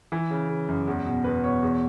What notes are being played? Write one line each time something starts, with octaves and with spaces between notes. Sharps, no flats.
E3
C#3
C#3
F#2
E2
B2
E2 B4
B2 C#5
E2